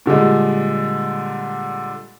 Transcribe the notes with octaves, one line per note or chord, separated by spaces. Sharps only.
A#2 D3 G3 G#3